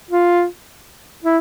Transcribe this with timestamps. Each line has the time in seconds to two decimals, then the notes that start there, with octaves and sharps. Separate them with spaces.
0.11 F4
1.24 E4